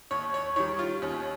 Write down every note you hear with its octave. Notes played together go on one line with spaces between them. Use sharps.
D#2 C#5
C#5
D#3 G3 C#5
F4
D#2 C#4